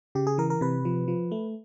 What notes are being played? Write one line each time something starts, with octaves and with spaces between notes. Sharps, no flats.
C#3 G4
G#4
E3 A#4
A#4
C3 B4
F3
F3
A3